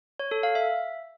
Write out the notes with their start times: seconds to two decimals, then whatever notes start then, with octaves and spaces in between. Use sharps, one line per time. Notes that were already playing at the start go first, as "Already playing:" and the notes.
0.19 C#5
0.31 A4
0.43 F5
0.55 E5